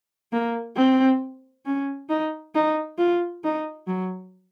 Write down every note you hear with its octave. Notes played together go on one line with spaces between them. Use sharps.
A#3
C4
C#4
D#4
D#4
F4
D#4
F#3